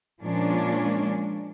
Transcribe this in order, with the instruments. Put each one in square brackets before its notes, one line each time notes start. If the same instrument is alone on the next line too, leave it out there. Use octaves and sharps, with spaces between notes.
[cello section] A#2 F3 G#3 C#4 D4